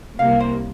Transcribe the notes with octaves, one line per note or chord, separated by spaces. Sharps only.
C2 C3 A#3 F5
C5